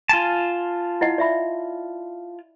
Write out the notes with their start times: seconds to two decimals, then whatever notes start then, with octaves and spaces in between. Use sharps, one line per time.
0.09 F4 G#5 A5
1.01 E4 D#5 F#5
1.18 D5 E5 B5